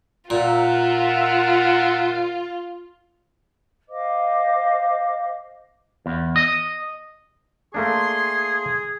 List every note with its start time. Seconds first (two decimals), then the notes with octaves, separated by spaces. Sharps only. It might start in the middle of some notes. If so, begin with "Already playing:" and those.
0.30 A#2 F4 A#4 E5 F#5
3.89 C5 D#5 F5 D6
6.06 E2
6.36 D#5
7.74 A3 A#3 D4 G#4 C6